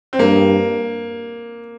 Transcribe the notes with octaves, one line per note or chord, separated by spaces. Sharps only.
C4
G2 A#3